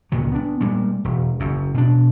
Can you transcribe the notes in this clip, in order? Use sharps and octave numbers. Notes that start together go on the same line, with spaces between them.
C#2 A#2 D#3 F#3
B3 D4
A#2 G3 G#3
E1
F#1 F#2
B2 D4